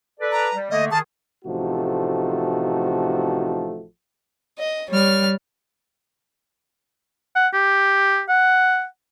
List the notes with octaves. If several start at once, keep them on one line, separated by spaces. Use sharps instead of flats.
A4 B4 D5
A#5
G3
D3 A3 A#3 D#5
D#3 G#4 A5
A1 C3 F3 A3 D#4 F#4
D#5
G3 C#5 F6
F#5
G4
F#5